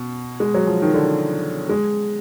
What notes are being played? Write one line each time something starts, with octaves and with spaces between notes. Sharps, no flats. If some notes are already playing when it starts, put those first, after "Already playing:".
Already playing: B2
G#3
F#3
F3
D#3
D3
G#3